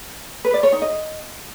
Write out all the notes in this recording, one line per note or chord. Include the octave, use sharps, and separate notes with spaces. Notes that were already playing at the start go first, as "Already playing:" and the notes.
B4
D5
C#5
D#4
D#5